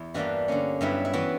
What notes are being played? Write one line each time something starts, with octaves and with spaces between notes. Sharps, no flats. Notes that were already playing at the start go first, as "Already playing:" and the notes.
Already playing: E2 E4
G2 E3 G3 A#3 D4 F#4
D3 A#3 C#4
G2 F#3 B3 E4
E4
E3 B3 F#4